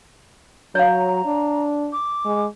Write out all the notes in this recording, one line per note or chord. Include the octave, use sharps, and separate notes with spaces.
F#3 C#5 F5 A#5
D4
D6
G#3